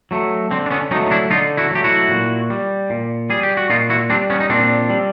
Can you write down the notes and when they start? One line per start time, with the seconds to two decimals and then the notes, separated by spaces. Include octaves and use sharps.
0.11 F#3 A3
0.51 D3 C4
0.66 D4
0.71 B3 C#4
0.91 F#3 C#4 D#4
0.95 A3
1.06 D#4
1.11 D4 E4
1.30 D3 D#4 F4
1.57 E4 F#4
1.71 F#3 A3 G4
1.84 E4 F#4
2.10 A#2
2.50 G3
2.90 A#2
3.30 G3 G#4
3.43 G4
3.57 F#4
3.70 A#2 D#4 F4
3.90 E4 F#4
4.10 G3 C4 D4
4.30 B3 C#4
4.40 D#4
4.49 A#2 C4 D4
4.90 G3